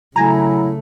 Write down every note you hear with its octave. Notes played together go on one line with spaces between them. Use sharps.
C#3 F#3 A3 E4 G#5 A#5